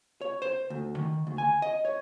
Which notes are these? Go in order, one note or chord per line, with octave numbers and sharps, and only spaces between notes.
C#5
C5
D2
D#3
D2
G#5
D#5
C#5